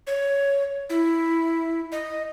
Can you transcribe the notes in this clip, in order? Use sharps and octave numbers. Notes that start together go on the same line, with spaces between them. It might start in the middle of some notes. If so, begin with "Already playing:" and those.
C#5
E4
D#5